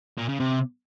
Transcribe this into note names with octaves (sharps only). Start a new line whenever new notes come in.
A#2
C#3
C3